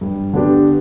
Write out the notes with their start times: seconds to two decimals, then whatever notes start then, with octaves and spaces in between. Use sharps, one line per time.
0.01 G2
0.33 D3 B3 D4 G4